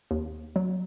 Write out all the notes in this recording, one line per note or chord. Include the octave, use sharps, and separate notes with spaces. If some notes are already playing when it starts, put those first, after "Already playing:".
D#2
F#3